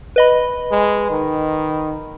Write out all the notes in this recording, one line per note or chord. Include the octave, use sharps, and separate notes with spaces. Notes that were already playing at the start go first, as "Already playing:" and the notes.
B4 D#5 B5
G#3
D#3